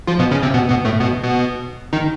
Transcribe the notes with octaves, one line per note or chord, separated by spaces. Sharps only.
F3 F4
B2 B3
C#3 C#4
C3 C4
B2 B3
B2 B3
A2 A3
B2 B3
B2 B3
D#3 D#4